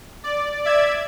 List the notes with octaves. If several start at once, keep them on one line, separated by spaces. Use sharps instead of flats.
D5
D5 E5 G#6